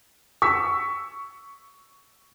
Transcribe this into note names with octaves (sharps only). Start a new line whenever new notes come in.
C#6 E6 B6